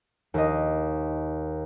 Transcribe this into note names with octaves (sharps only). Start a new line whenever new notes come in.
D#2 D#5